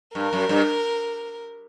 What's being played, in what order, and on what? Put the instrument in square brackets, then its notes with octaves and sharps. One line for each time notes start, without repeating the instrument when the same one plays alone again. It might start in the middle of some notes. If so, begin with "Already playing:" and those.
[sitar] G2 [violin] A#4
[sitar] F#2
G2